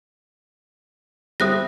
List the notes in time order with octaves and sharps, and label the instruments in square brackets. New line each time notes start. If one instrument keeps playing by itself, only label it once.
[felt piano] G3 C4 E5 [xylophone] D#6 F#6 A#6